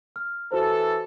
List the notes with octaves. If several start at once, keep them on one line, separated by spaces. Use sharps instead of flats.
F6
E3 F#4 A4 C5